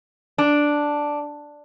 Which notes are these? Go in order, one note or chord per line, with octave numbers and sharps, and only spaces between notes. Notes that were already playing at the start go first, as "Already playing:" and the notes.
D4